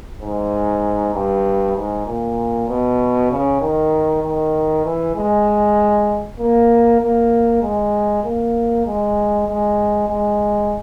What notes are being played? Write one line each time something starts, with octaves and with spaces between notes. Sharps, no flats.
G#2
G2
G#2
A#2
B2
C#3
D#3
D#3
E3
G#3
A#3
A#3
G#3
A#3
G#3
G#3
G#3